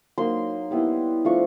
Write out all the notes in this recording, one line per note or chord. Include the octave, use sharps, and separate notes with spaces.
F#3 A#3 D#4 C6
G3 B3 E4
F3 A3 D4 F4 C#6